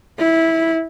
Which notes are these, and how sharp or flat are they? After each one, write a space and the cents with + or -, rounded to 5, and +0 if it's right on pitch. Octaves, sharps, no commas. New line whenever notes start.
E4 -15